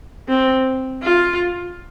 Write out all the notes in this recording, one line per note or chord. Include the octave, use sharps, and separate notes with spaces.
C4
F4